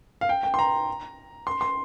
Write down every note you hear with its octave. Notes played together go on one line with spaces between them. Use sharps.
F5
G5
G5
C6
A#5
C6
C6